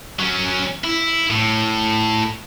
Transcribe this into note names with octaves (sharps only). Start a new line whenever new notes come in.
F#3 C#4
E4
A2